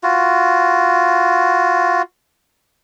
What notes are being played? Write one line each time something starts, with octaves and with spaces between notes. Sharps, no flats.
F4 F#4